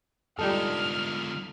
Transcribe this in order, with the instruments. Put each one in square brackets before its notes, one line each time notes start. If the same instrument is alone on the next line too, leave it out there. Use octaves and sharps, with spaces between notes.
[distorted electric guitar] G#2 D3 [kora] G3 D#4 A4 [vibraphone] F4 D#6 [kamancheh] F6